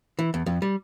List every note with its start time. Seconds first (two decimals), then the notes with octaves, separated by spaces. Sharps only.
0.19 E3
0.34 E2
0.46 F2
0.62 G3